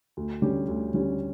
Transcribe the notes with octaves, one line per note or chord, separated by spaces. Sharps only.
D2
D3 G3 C#4 G4
D2
D3 G3 C#4 G4